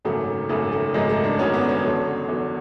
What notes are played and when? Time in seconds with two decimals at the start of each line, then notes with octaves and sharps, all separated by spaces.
0.05 G#1 F#2 C#3 F#3 A3
0.49 G#1 F#2 C#3 F#3 A3
0.72 A3
0.94 G#1 F#2 C#3 F#3 G#3
1.09 A3
1.24 D4
1.39 G#1 F#2 C#3 F#3 C#4
1.54 B3
1.69 C#4
1.83 E2 D3 F#3
2.28 E2 D3 F#3